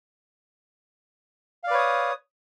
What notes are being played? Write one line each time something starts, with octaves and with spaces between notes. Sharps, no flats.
B4 C#5 D5 F5 D#6